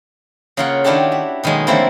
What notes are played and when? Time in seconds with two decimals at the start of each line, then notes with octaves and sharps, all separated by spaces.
0.57 C#3 A#3 F4 A#4 C#5 F#5
0.84 D#3 D4 E4 F#4 G4 A4
1.12 E5
1.44 B2 D#3 F#3 G#3 A#3
1.67 D3 F3 A3 A#3 C4 E4